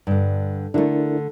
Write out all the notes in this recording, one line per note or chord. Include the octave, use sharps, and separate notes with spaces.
G2 D3
D3 A3 D4 E4 A#4